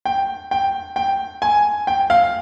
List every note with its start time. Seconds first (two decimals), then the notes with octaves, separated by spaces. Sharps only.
0.05 G5
0.51 G5
0.96 G5
1.42 G#5
1.87 G5
2.10 F5